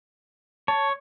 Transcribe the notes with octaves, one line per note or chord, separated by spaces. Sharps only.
C#5 A5